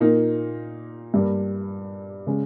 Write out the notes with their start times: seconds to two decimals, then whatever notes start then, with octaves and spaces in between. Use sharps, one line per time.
0.01 A#2 A#3 D#4 A#4
1.14 G2 G3 A#3
2.27 C#3 G#3 C#4